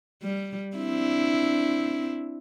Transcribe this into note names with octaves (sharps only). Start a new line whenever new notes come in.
G3
C4 D4 E4